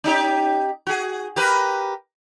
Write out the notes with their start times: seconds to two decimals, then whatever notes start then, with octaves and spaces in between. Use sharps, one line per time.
0.04 C#4 D#4 G4
0.87 F#4 G#4
1.36 G4 A#4 B4